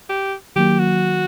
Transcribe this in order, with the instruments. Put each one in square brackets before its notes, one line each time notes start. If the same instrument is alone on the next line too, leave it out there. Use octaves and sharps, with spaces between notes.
[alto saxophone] G4
[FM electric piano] D#3 F#3 A#3 [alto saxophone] G4
[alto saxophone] F#4